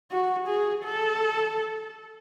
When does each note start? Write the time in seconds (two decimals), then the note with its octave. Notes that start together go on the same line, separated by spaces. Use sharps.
0.11 F#4
0.47 G#4
0.84 A4